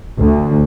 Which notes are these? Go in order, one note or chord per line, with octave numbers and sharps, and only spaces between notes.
D2